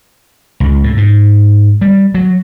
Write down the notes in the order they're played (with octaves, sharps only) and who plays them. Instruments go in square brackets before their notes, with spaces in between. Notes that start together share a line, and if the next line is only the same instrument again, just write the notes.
[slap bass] C#2
A2
G#2
G3
F#3